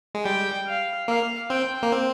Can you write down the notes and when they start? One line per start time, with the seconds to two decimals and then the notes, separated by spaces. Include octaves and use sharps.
0.15 G#3
0.25 G3 G5
0.67 F5
1.08 A#3 F5
1.50 C4 G5
1.83 A#3
1.92 C4